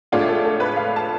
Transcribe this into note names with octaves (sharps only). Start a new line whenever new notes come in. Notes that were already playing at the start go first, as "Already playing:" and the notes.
A2 G#3 D4 F4 A4
A4
A4
B4
F5
A5